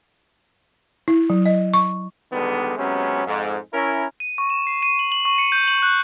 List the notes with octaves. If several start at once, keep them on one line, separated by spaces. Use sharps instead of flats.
E4
F#3
D#5
C#6
B2 D3 D#3 G3 G#3 B3
C3 F#3 G#3 B3 C#4
F2 G#2
C#4 E4 A#4
D#7
C#6
E7
C7
D#7
F#7
F#7
C#6
C#7
G6
F#7
F#6